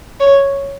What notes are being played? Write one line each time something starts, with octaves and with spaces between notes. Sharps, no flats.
C#5